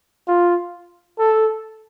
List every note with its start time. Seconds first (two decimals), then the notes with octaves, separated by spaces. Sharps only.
0.28 F4
1.19 A4